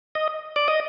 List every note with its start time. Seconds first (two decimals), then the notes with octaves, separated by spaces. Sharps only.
0.15 D#5
0.56 D5
0.68 D#5